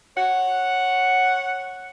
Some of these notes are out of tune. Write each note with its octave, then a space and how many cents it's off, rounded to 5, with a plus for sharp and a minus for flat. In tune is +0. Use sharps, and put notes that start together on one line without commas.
C#5 -15 F#5 +0